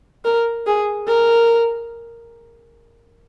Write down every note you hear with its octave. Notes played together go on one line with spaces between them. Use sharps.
A#4
G#4
A#4